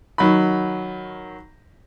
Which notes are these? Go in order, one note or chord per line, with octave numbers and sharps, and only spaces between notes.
D#3 F#3 B5